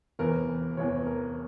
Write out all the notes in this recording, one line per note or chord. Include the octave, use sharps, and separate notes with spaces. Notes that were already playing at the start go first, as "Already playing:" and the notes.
F1 E2 E3 A#4
F1 E2 E3 C#5
A#4